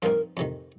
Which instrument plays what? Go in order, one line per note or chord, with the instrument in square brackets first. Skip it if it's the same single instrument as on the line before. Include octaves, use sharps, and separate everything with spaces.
[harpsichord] G2 F3 C4 D#4 [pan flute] A#4
[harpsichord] F2 C3 D#3